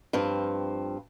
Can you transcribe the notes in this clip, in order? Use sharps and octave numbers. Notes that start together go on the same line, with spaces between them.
G2 F3 C4